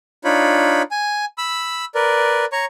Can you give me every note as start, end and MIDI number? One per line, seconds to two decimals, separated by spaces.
0.25 0.82 62
0.25 0.82 63
0.25 0.82 65
0.25 0.82 73
0.25 0.82 83
0.91 1.25 80
1.38 1.85 83
1.38 1.85 88
1.95 2.45 70
1.95 2.45 71
1.95 2.45 74
2.52 2.65 73
2.52 2.65 82
2.52 2.65 85